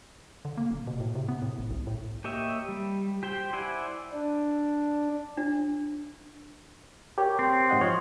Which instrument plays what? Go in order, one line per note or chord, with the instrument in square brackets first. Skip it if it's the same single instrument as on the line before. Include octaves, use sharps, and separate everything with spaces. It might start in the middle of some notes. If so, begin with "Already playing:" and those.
[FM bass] D3
A#3
D#1
B2
A2
C3
B3
A2
G#1
C2
A2
[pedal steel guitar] A#3 G4 C#5 D#5 E5
G3
G4 C5 G5
E4 C5 D5 F#5 G#5
[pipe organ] D4
[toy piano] D4
[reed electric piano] G4 A#4 C#5
[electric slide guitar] C4
[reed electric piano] G#2 D#5 F#5
[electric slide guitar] F3 [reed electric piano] C#5